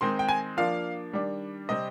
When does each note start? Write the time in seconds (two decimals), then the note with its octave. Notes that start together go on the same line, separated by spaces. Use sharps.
0.01 D#3 G#3 C4 D#4 C6
0.19 G5
0.29 G#5
0.57 F3 A#3 D4 F5
1.13 D#3 G3 D4
1.69 C3 G3 C4 D#5